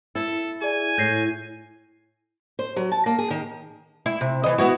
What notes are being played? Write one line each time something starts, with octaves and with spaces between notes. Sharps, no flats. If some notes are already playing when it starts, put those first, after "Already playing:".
E4 A4
G#4 D5 G#5
A2 G6 A#6 C7
C5
F#3
A5
A#3
G#4
D#3
E4
C3
E3 D#5
B3 E4 F#4